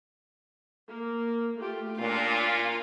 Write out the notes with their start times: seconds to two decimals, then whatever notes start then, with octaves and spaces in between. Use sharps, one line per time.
0.89 A#3
1.59 A3 F4 G4
1.99 A#2 C#4 D4 F4